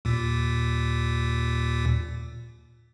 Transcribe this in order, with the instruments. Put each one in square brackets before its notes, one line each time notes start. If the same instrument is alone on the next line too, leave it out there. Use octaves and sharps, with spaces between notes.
[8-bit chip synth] D#2 A#2